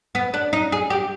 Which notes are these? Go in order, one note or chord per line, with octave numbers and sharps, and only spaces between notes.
B3
D4
D#4
G#4
G4